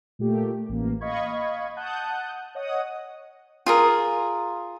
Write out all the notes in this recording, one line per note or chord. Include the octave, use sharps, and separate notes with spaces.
A#2 A3 G4
A1 A#3
D#5 F5 B5 C#6 G#6
F#5 A5 D#6 F#6 G6
C#5 D#5 F#5 D#6
F4 G#4 A#4